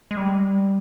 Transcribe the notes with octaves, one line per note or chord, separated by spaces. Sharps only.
G#3
G3